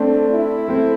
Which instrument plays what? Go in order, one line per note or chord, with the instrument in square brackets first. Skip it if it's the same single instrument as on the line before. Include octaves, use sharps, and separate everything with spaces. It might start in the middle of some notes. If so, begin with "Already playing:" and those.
Already playing: [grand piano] A3 C4 [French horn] D4
[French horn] E4
[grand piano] A3 C4